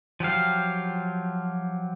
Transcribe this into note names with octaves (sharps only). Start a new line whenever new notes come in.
F3 F#3 G4 F5